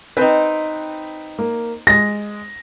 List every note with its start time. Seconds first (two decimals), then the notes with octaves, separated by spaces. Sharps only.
0.17 C4 D#4 B4 G5
1.39 A#3
1.87 G#3 A#6